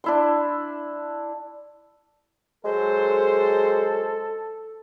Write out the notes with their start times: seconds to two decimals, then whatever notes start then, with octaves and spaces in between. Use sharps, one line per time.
0.04 D4 E4 C6
2.65 F#3 G#3 A4 C5